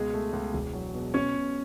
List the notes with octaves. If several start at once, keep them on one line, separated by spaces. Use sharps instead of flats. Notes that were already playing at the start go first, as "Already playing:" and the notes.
Already playing: C#2 B2 G#3 G#4
A3
C#2
E1
F#3
B2
B2 C#4 C#5
B2